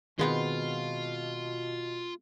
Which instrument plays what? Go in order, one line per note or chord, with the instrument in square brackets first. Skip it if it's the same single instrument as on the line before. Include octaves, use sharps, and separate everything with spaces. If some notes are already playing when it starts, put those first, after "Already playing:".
[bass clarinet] B2 [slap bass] D#3 [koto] G#3 B3 C4 [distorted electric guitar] F4